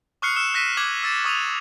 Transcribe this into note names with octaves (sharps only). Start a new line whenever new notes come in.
C#6 D#6 F6 F#6 C7 C#7
E6 F6 E7
E6 F#6 A#6 B6 D#7 E7
D6 F#6 G#6 F#7
E6 A6 E7
C#6 D#6 D#7 F7